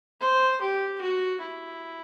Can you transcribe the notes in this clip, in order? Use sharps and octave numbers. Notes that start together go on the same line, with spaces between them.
C5
G4
F#4
E4